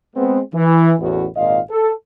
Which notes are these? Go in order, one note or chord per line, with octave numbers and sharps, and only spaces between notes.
G#3 B3 C4
E3
A1 E2 A2 B3 F#4 B4
G#1 A#2 F4 D#5 F5
A4